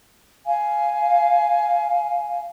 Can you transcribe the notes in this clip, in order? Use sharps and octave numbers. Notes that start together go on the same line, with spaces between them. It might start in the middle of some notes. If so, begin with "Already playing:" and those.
F5 G#5